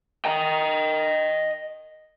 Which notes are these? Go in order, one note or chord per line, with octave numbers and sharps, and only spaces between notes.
D#5 G5